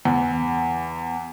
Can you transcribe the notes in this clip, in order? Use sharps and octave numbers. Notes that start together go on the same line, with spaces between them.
E2